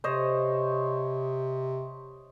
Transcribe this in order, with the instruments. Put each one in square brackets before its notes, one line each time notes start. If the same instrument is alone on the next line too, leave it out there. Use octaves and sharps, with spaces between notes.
[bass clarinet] C3 [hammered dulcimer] C5 C#5 D#5